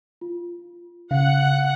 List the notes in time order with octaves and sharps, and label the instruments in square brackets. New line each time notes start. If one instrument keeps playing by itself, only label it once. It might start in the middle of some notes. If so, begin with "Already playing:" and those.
[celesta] F4
[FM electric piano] C#3 [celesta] F5 [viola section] F#5